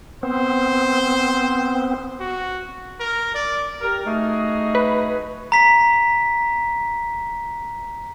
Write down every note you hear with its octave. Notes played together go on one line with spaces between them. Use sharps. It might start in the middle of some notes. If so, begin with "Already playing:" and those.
B3 C4 C5
F#4
A#4
D5
G4 A#4
A3 D#4 F#4 G#4
B4
A#5 B6